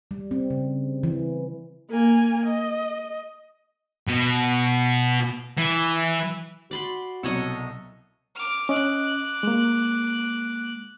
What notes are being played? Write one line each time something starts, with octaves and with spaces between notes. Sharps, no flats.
G3
C4
C#3
E3
A#3 G#5
D#5
B2
E3
F#4 D5 B5 C6
C2 B2 F#3 A4 C#5 D#5
D6 F6
C#4 D#5 D6 F#6
G#3 A#3